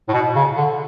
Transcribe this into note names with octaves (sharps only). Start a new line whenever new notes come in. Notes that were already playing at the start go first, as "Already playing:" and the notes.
A2
B2
C#3
D3